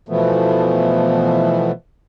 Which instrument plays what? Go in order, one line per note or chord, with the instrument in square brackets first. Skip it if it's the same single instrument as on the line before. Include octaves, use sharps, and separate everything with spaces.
[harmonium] B2 E3 F3 A3 B3